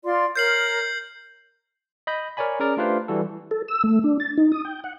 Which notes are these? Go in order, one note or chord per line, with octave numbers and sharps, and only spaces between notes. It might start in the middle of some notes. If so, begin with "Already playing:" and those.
F4 D5 C6
A#4 C#5 F6 G6 C7 F#7
D#5 B5 G6
A#4 C#5 D5 G#5 B5
C#4 G#4 A#4 D5
A3 D4 F4 G4 B4 C5
E3 G3 F#4 A4
A4
E6
A3
D4
A6
D#4
D#6
G5
F#5